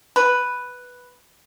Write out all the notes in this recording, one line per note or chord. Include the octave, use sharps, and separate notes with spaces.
B4